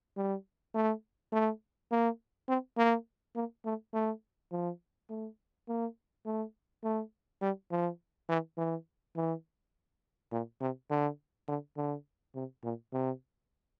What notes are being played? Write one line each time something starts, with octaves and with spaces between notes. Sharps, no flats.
G3
A3
A3
A#3
C4
A#3
A#3
A3
A3
F3
A3
A#3
A3
A3
G3
F3
E3
E3
E3
A#2
C3
D3
D3
D3
C3
A#2
C3